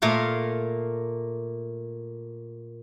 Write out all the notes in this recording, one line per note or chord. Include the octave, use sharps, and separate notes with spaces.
A#2 A3 A#4 F5